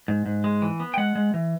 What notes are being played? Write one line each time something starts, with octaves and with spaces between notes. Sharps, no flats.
G#2
G#2
G#3
E3
B3
G5
G#3 F#5
G#3
E3